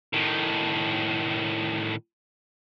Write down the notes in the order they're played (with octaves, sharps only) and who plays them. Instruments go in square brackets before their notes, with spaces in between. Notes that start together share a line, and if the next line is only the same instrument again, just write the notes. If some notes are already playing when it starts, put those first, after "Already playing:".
[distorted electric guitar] A2 D#3